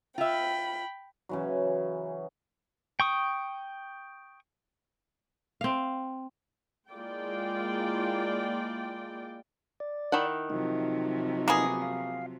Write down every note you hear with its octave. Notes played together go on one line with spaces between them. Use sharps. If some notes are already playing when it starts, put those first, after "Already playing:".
F4 E5 G5 B5
C#3 E3 F#3
G5 C#6 D#6
C4 F5
G#3 A#3 E4 F4 D5 G5
D5
D#3 E4 F#5
C3 F3 F#3 D#4
A#3 B3 G#4
F5